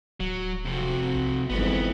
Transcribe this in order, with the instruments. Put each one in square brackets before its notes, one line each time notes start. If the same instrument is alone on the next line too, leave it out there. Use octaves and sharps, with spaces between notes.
[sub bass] D1 [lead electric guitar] F#3
[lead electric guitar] F2 C3 [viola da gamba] C4 F#4
[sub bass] B1
[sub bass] G1 [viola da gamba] F2 G#2 E3 [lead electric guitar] B3